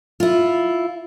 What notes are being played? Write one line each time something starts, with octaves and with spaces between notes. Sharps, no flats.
E4 F4